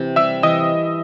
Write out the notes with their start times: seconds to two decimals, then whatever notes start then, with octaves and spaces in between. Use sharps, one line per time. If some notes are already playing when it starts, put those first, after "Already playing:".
Already playing: C3 E3
0.16 G3 E5 E6
0.43 E3 D#5 D#6